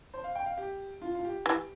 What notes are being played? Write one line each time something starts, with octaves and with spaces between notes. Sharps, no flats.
C5
F5
G5
F5
G4
F4
F4
G4
E3